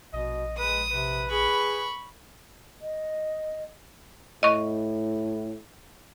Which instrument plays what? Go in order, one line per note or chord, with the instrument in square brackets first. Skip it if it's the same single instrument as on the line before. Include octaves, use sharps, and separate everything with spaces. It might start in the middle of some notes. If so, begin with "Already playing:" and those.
[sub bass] A#1 [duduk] B2 [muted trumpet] D#5
[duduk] G#3 [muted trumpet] B4 [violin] D#6
[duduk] C3 [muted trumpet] B4
[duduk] G#4 [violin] B5 C#6
[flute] D#5
[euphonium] A2 [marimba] D#5 C#6